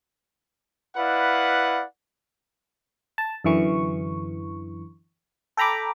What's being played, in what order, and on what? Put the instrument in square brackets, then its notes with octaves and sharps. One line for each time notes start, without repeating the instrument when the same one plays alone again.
[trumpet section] E4 B4 D5 F5 F#5
[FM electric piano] A5
F#2 D3 E3 C#6
A4 G5 A#5 B5 D6